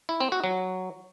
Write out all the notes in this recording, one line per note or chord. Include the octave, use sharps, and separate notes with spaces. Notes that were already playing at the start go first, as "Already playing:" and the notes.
E4
C4
F#4
F#3